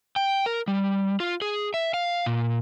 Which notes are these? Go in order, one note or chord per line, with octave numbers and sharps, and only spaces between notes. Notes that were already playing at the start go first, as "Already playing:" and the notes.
G5
A#4
G3
F4
G#4
E5
F5
A#2